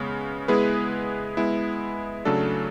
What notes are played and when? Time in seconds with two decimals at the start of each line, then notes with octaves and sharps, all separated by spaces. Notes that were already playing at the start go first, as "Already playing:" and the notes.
Already playing: C#3 G#3 B3
0.48 G#3 B3 E4 G#4 B4
1.37 G#3 B3 E4
2.25 C#3 F#3 A3 D4 A4